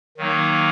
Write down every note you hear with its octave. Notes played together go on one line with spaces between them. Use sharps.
D#3 F#3 A#3 D#4